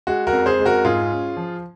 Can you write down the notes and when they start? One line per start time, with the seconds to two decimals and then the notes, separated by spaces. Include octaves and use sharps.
0.07 G#3 F#4
0.27 F#4 A#4
0.33 F2
0.46 G#4 C5
0.59 G#3
0.66 F#4 A#4
0.85 G#2 F4 G#4
1.11 C#4
1.37 F3